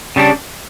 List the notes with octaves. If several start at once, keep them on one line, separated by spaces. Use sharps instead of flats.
C#3 G3 D4